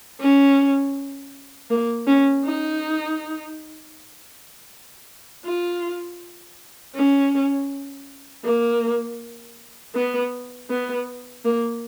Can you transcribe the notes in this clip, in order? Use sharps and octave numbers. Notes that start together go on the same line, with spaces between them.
C#4
A#3
C#4
D#4
F4
C#4
A#3
B3
B3
A#3